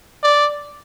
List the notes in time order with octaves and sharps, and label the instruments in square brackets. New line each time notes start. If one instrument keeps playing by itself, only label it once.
[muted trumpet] D5